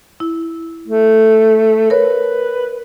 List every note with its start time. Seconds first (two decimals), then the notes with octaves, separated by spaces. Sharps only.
0.20 E4
0.88 A3
1.90 A#4 B4 C#5